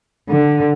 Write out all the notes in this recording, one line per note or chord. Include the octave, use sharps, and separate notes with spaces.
D3